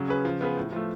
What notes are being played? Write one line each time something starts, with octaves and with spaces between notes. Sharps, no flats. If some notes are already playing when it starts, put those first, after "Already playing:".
Already playing: C#3 F#3
C#4 G#4 B4
F3
B3 F4 G#4 B4
A2
F3 A3